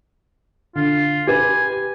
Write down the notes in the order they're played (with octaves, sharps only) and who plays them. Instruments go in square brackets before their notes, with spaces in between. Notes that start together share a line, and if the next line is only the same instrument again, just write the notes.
[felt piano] D3 [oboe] F4
[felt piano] G4 B4 [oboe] G#5